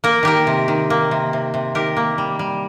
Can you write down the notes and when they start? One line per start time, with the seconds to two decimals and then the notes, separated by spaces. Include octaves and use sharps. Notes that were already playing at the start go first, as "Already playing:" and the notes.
0.04 A#3 A#4
0.23 D#3 G4 A#4
0.47 C3
0.68 D#3
0.90 A#3
1.11 C3
1.33 C3
1.54 C3
1.75 D#3 G4 A#4
1.97 A#3
2.18 G3
2.39 G3